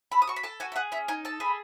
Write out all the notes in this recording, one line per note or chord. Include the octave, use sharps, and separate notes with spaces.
A4 B5
D#6
F#4 C#6
B5
A4 A5
F#4 G#5
E5
G#4 F#5
C#4 E5
D#4 G#5
A4 A5
G#4 B5